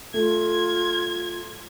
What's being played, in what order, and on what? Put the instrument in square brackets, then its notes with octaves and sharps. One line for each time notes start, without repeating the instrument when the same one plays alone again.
[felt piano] A3 [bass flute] F4 [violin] G#6